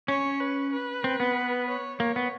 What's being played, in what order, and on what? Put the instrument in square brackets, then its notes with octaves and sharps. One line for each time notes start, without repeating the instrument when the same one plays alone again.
[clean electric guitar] C#4 [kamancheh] C#5
[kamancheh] B4
B4
[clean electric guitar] C4
B3
[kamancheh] C#5
[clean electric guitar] A#3 [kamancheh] C#5
[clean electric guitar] B3